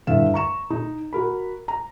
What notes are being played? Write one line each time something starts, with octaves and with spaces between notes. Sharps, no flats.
G2 D3 E4 E5 F5 E7
A#5 C#6 E7
D#4 D#5
F#4 A#4 B5
A#5